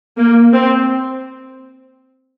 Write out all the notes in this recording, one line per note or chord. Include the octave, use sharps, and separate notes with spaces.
A#3
C4